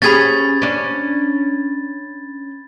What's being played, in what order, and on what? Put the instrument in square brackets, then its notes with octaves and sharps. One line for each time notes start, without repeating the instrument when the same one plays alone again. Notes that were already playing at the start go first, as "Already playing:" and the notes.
[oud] C#4 G4 G#4 [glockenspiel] B5 G#6 A6
[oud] C#4 D4